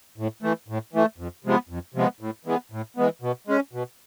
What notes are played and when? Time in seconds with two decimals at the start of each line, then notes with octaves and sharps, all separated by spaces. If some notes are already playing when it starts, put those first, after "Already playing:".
0.18 A2
0.43 E3 A3
0.68 A2
0.93 E3 A3
1.18 F2
1.45 C3 F3 G#3 B3
1.69 F2
1.94 C3 F3 G#3 B3
2.20 A2
2.45 E3 G#3 B3
2.72 A2
2.97 E3 G#3 B3
3.22 B2
3.47 G#3 C#4
3.73 B2